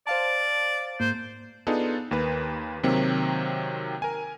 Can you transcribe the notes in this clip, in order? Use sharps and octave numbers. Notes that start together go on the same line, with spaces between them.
C5 D5 F5 A5
G#2 A#3 C5
B3 D4 D#4 F4 G#4 A4
D#2 A#3 B4
C3 D#3 F#3 A#3 C4
A#4 G#5